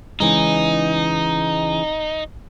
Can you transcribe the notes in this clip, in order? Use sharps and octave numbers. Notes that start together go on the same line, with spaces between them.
C#3 E3 G#3 D#4